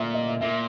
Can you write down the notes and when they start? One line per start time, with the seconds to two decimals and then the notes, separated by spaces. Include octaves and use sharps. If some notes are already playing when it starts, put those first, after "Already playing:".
Already playing: A#2 E5
0.14 D#5
0.28 E5
0.41 A#2 E5